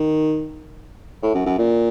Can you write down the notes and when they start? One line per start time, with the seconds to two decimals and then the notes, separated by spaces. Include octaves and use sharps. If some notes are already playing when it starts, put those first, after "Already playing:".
Already playing: D#3
1.23 A2
1.35 F#2
1.46 F#2
1.58 A#2